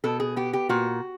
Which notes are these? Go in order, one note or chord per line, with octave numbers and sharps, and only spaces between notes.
B2 A4
G#4
B3 G4
G4
A#2 F#4